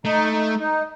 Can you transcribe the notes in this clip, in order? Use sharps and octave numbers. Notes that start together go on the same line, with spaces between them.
A3 D#4
D#4
D#4